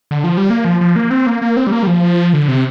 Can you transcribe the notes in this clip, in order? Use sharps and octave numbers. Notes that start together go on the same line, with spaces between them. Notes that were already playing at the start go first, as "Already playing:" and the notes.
D3
F3
G3
A#3
F3
F3
A#3
C4
A#3
A#3
C4
G3
A#3
G3
F3
D3
C3